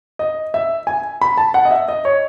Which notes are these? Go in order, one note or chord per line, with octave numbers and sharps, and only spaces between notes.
D#5
E5
G#5
B5
A5
F#5
D#5
E5
D#5
C#5